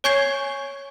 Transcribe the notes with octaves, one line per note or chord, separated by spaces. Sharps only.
C#5 G#5 C#6 G6 G#6 C7